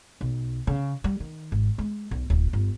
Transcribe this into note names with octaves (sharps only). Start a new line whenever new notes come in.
B1
C#3
G3
D#3
G#1
G#3
B1
D1
G1